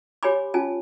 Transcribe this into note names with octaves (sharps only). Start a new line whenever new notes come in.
G4 C#5 G#5 B5 D6
C#4 F4 G#5 A5